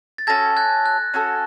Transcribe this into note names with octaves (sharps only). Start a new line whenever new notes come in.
A6
C#4 F#4 A4 G#6 A#6
F#6 G#6
F#6
C#4 F#4 A4